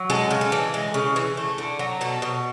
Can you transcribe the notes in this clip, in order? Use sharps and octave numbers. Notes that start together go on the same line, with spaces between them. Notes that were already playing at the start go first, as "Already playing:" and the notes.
Already playing: F#3
G#3 A4
C#3
A4
E3
G#3
C#3
E3
A3
D3
F#3
B2 A4
B2